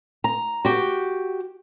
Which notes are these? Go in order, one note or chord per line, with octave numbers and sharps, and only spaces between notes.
A#5
F#4 G4